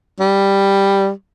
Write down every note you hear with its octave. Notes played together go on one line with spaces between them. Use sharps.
G3